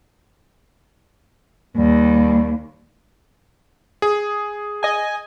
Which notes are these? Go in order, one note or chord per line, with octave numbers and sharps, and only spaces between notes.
D#2 G3
G#4
D#5 G#5